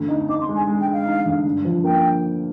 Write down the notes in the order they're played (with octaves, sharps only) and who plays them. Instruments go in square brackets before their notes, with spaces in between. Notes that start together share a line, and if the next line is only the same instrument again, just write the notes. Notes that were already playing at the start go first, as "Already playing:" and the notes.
Already playing: [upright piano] D2
D#4
[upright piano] D#4 [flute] D6
[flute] C6
[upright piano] G#3
[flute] G#5
[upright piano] G#3
[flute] G5
[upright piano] G#3
[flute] F5
[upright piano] D#4
D2
G2
F3
[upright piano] A#3 [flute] G5